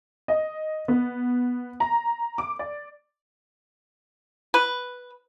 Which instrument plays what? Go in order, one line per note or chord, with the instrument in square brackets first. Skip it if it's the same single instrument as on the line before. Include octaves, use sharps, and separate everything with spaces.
[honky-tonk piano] D#5
B3
A#5
D6
D5
[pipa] B4